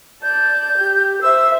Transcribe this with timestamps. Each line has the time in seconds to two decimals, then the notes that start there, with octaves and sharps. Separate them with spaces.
0.23 D5 A5 G6
0.78 G4
1.22 C5 E5 E6